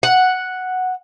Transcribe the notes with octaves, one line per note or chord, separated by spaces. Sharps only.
F#5